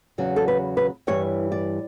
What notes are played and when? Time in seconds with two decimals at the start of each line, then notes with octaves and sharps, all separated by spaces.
0.18 E2 C#3 F#3
0.36 A4
0.48 B4
0.77 B4
1.07 G2 E3 G3 C#5
1.52 D5